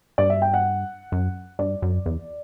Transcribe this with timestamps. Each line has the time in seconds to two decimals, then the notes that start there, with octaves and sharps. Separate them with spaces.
0.18 G2 D5
0.30 E5
0.42 G5
0.54 F#5
1.12 F#2
1.59 G2 D5
1.82 F#2
2.06 E2